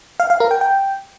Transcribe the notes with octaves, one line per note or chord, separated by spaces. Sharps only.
F5
F5
A#4
G5
G5